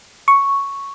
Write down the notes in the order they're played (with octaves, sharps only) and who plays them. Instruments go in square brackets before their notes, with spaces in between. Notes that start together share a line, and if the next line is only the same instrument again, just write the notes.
[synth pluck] C#6